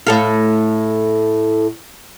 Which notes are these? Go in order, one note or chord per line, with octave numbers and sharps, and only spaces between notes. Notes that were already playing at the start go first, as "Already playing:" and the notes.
A2 A4 F5